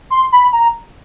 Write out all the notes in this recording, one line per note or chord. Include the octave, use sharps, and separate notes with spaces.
C6
B5
A#5